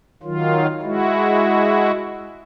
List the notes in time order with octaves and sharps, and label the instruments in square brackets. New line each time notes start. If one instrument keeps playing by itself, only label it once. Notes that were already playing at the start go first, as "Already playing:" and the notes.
[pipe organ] D#3 F#3 F4
G#3 E4 F#4